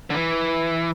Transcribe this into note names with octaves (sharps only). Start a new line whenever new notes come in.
D3
E3